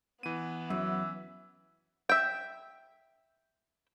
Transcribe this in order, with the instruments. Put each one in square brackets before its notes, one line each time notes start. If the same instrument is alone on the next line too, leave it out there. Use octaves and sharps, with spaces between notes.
[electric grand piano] E3 D#7 [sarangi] B3
[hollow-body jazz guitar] F#2 [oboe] E5
[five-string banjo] E5 G5